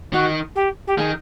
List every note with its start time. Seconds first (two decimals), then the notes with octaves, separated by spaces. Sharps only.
0.13 D#3 F#4
0.55 G4
0.87 G4
0.98 D#3 G#4